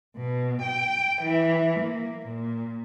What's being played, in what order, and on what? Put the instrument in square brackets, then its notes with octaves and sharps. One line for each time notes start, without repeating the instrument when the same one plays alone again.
[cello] B2
G5
E3
A#3
A#2